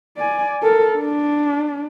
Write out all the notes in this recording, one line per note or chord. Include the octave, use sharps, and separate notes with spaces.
D5 G#5
A4 A#4
D4